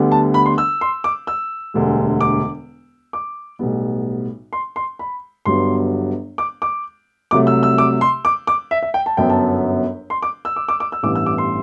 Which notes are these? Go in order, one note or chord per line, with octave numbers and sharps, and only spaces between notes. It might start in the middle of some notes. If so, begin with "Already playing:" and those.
Already playing: D2 D3 G3 B3
A5
B5
C6
E6
C6
D6
E6
E1 D2 D3 G3
D6
D6
B1 A2 G3 B3
C6
C6
B5
G1 G2 F#3 B3 C6
D6
D6
C2 C3 F#3 A3 D6
E6
E6
D6
C6
D6
D6
E5
E5
G5
A5
G1 F#2 F#3 B3 G5
A5
C6
D6
E6
D6
D6
D6
E6
A1 G2 E3 B3 D6
E6
D6
C6